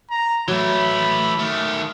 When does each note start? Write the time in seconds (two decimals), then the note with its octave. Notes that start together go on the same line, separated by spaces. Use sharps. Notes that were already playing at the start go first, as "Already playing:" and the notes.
0.11 A#5
0.48 E3 F#3 A3 B5
1.39 D#3 A3